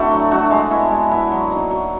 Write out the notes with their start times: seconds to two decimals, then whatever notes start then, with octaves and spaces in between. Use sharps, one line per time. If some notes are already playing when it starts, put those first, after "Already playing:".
Already playing: A3 C4 D4 E4 F#4
0.11 F#3
0.31 A3 D4 F#4
0.51 G#3
0.71 B3 E4
0.91 G#3
1.11 B3 E4
1.32 F#3
1.52 A#3 D#4
1.71 F#3